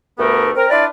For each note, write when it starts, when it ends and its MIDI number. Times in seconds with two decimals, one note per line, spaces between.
0.18 0.51 38
0.18 0.51 43
0.18 0.51 57
0.18 0.51 59
0.18 0.51 70
0.56 0.70 60
0.56 0.70 70
0.70 0.86 62
0.70 0.86 64
0.70 0.86 65
0.70 0.86 71
0.70 0.86 74